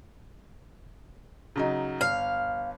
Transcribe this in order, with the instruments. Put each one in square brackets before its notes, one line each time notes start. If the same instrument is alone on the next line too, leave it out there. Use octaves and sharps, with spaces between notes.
[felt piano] C#3 F#3 D#4
[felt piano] G1 [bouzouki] F5